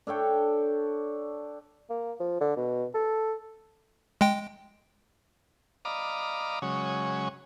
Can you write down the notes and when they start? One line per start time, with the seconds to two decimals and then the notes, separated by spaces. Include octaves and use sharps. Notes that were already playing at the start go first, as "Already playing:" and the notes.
0.07 D4 A4 C#5 G5
1.89 A#3
2.20 F3
2.40 D3
2.57 B2
2.94 A4
4.21 G#3 G5
5.85 D5 D#5 F5 A#5 B5 D6
6.62 C#3 F#3 G#3 C#4